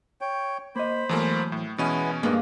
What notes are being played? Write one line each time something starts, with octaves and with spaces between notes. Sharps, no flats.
C#5 G5
A#3 C5 D#5 B5
E2 E3 F#3 A3 A#3
A2
B2 E3 G#3 B3 C#4 E4 D#7
G2 A#3 B3 G#4 D#5